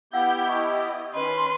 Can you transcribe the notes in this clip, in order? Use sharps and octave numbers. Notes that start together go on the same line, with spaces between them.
B3 E4 G4 F5 F#5 E6 G6
D#5 A5 C#6
D#3 C#4 B4 C6